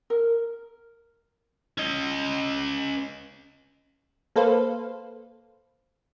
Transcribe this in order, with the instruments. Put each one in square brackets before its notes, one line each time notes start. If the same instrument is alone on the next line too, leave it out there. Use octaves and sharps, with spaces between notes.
[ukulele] A#4
[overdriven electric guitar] C#4 D#5
[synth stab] A#3 A4 B4 C5 F5